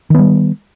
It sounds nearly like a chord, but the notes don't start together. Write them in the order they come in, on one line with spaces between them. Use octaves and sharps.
D#3 B3 G3